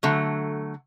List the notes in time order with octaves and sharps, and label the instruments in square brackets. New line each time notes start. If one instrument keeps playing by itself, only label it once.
[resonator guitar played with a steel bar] D3 F#3 A3